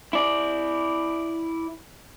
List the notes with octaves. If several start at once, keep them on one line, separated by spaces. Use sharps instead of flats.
E4 D5